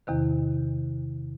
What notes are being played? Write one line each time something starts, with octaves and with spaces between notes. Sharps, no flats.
E2 C3 D#3